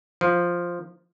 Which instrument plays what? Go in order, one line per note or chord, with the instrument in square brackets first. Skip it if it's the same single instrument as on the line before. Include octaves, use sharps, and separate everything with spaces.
[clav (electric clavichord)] F3